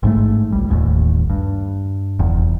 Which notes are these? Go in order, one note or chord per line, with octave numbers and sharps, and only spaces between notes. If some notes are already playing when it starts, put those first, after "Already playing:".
A1 G#2 A3
C#2 G3
D#1 A1 D#2
G2
F1 E2